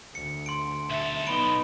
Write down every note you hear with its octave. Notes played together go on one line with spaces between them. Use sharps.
D2 C#7
C6 D7
B1 A4 E5
B3 D#4 B5 D7 G7